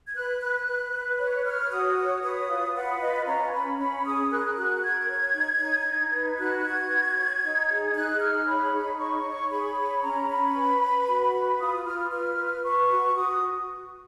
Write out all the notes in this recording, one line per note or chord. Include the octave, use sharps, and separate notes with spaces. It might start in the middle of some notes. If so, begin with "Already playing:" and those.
G#6
B4 F#6
B4 F#6
B4
B4
C#5 F#6
C#5 F6
F#4 D#6
C#5
B4 D#6
F4
B4 F#5
F4 D#5
C#4 A#5
C#4 B5
C#4 B5
G#4 D#6
A#4 F#6
F#4 F#6
A#4 G#6
C#5
D#4
D#4
D#4
B4
F#4 F#6
F#4 G#6
F#4
C#5
D#4
G#4
D#4 F#6
G#4 F6
C#5 B5
D#4
C#5 C#6
C#5
G#4 B5
C#5
C#4 A#5
C#4 B5
B4
B4
F#4
B4
F4 D#6
F4 F6
B4 F6
B4
B4 C#6
F#4
F#4 D#6